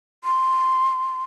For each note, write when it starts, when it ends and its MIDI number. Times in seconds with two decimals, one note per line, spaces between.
0.24 1.24 84